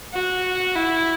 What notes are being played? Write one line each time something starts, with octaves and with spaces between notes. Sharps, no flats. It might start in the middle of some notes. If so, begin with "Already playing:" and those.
F#4
E4